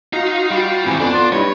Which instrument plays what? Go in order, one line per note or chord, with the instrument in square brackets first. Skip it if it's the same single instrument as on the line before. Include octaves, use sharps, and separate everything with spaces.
[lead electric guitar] D#4 [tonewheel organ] F4 F#4 F5
[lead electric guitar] G3
[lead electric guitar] G#2 D#3 [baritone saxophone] E3 [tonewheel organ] C4
[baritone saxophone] F2 [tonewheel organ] B3 [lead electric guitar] D4
[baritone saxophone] F4
[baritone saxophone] G2 [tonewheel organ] G3 E4 D#5 [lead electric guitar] C#5